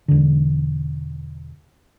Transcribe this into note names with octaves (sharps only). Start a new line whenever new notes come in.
E1 D3